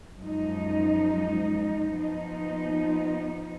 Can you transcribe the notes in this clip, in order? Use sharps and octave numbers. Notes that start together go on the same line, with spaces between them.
F#2 F3 G#3 D#4
F3 B3 D#4